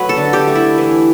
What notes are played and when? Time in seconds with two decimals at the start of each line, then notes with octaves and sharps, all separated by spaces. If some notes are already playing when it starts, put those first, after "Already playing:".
Already playing: F#3 A3 B4
0.09 A4
0.17 D3
0.33 G4
0.48 A3
0.55 E4
0.78 E3